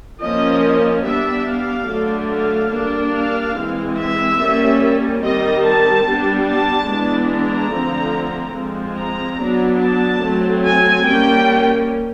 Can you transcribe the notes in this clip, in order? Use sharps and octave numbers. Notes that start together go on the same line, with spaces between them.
F3 A#3 C#4 D#5
G3 B3 D4 E5
F5
D3 F#3 A3 D4
F5
G3 A#3 D4
F5
E3 G#3 C4
E5
G3 A#3 C#4
D#3 G3 C4 D#5
A5
G3 B3 D4
A5
E3 G#3 B3 D4
A#5
D3 F3 A3 C4
F3 G#3 C4
A#5
F#3 B3 D4
A5
F#3 A3 C4
G#5
G3 A#3 C#4 G5